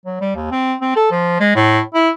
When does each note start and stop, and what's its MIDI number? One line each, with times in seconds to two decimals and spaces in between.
0.06 0.20 54
0.21 0.34 55
0.36 0.46 39
0.51 0.75 60
0.81 0.94 60
0.96 1.06 69
1.11 1.40 53
1.40 1.55 56
1.56 1.80 45
1.94 2.10 64